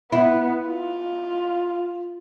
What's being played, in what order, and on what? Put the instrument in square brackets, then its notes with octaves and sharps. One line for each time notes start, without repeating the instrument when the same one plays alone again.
[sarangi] B3 [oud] E4
[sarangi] F4